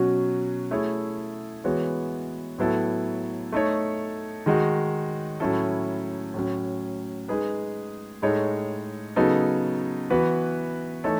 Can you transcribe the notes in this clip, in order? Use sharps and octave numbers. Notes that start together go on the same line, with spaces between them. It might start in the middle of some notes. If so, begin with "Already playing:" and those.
Already playing: B2 F#3 C#4 F#4
A3 E4 G#4 C#5
E3 G#3 B3 F#4 C#5
A2 F#3 B3 E4 A4
A3 D#4 A4 C#5
D#3 G#3 D#4 F#4
A2 F#3 C#4 E4 A4
A2 F#3 C#4
G#3 D#4 G#4 B4
A2 G#3 D#4 A4 C#5
C#3 F#3 B3 D#4 A4
E3 B3 F#4 B4
E3 A3 D#4 A4 C#5